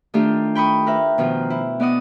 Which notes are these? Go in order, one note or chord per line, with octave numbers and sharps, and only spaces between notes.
D#3 A3 D4 F4 G4
G5 B5 C#6 D#6
A#4 B4 E5
B2 D#3 F3 F4
E4
B3 D5 D#5 F#5 D#6